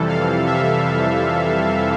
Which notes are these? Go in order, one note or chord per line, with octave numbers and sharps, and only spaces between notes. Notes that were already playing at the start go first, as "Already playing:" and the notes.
Already playing: F2 C3 E3 G3 A4
F5
E5